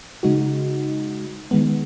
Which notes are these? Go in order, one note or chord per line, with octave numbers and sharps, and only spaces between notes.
C#3 G#3 D#4 F#4
D#3 G#3 B3